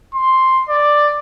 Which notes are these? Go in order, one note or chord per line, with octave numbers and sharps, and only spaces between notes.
C6
D5